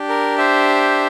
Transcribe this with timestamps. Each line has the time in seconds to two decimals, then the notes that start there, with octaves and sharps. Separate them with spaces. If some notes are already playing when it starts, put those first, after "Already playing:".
Already playing: D4 G4
0.09 A#4
0.38 C5 E5